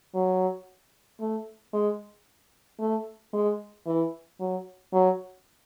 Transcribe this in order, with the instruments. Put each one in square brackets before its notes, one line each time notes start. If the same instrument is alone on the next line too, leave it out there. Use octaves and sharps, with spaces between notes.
[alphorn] F#3
A3
G#3
A3
G#3
E3
F#3
F#3